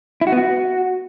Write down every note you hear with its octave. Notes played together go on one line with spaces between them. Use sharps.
E4
F#4
B3
F#4